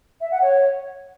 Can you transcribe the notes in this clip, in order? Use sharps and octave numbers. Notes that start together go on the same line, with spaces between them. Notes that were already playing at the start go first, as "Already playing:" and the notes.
E5
F#5
C#5